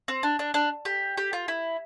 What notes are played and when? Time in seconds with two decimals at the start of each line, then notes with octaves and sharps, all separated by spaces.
0.08 C4
0.23 D4
0.39 D4
0.54 D4
0.85 G4
1.17 G4
1.33 F4
1.48 E4